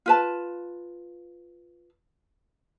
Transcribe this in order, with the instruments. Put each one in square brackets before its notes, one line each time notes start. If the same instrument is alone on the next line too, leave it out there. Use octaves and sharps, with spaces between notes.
[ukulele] F4 B4 A5